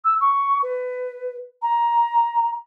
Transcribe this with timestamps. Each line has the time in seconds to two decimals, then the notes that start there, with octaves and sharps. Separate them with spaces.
0.04 E6
0.21 C#6
0.63 B4
1.62 A#5